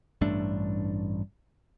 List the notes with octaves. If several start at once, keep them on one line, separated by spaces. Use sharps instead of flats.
A1 G2 A3 D4